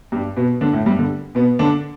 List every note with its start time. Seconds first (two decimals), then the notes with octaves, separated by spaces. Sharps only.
0.12 G2 G3
0.37 B2 B3
0.61 D3 D4
0.73 A2 A3
0.86 G2 G3
0.99 D3
1.35 B2 B3
1.59 D3 D4